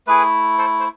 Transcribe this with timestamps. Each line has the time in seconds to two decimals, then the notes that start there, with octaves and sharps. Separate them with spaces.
0.07 A3 E4 G#4 B4
0.58 A4 C5
0.80 C5